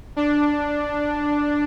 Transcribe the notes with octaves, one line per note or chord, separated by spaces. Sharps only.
D4